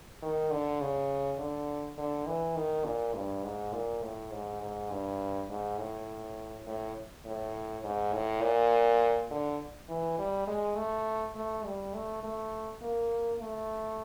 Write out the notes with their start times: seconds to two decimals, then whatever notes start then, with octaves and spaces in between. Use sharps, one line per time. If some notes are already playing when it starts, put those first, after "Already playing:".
0.22 D#3
0.51 D3
0.81 C#3
1.39 D3
1.98 D3
2.27 E3
2.56 D#3
2.85 A#2
3.15 G2
3.44 G#2
3.73 A#2
4.03 A2
4.32 G#2
4.61 G#2
4.91 G2
5.50 G#2
5.79 A2
6.67 A2
7.26 A2
7.84 G#2
8.13 A2
8.43 A#2
9.31 D3
9.89 E3
10.19 G3
10.48 G#3
10.77 A3
11.36 A3
11.65 G3
11.95 A3
12.23 A3
12.82 A#3
13.41 A3